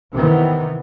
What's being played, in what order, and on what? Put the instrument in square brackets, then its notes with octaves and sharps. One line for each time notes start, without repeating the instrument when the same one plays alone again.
[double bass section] C3 D#3 E3 B3